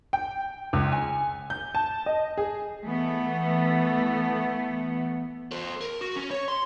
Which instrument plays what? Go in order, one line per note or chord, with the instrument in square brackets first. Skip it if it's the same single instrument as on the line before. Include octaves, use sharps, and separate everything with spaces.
[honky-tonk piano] G5
C#2
G#5
G6
A5
D#5
G#4
[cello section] E3 A3 B3
[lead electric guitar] A4 C5
A#4
F#4
C#4
C#5
C6